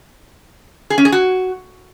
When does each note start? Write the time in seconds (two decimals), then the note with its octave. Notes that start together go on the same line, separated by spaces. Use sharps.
0.90 G#4
0.98 C#4
1.05 G#4
1.12 F#4